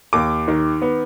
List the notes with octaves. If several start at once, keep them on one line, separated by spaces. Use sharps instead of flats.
D#2 D6
D#3
B3